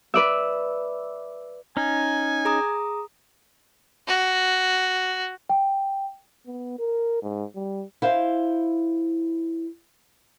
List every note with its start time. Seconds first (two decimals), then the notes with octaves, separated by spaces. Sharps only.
0.14 B4 D5 E5
1.77 C#4 D#4 G#5
2.45 G#4 A#5 D#6
4.08 F#4
5.50 G5
6.46 B3
6.79 A#4
7.22 G#2
7.55 G3
8.02 E4 C5 F5